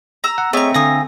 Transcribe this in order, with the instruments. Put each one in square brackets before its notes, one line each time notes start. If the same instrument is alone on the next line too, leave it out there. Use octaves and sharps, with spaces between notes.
[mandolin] A#5 E6
[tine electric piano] F#5
[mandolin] A3 A#5 [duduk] C4 [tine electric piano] G#4 C#5 D#5 [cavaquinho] E5
[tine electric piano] D3 A#6 [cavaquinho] F5 G#5 D#6